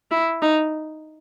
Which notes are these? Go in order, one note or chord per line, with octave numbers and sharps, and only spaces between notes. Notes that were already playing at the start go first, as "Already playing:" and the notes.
E4
D#4